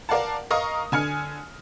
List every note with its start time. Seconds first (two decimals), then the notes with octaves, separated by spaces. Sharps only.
0.09 A#4 D5 F5 F#5 A5
0.50 A#4 D#5 F5 A#5 C#6 D#6
0.92 D3 G#5 F6 C#7